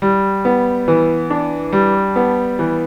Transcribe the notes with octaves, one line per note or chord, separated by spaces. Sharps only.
G3
B3
E3
D4
G3
B3
E3